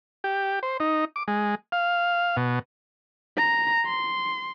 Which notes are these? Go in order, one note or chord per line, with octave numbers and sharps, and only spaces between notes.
G4
C5
D#4
D6
G#3
F5
B2
A#5
C6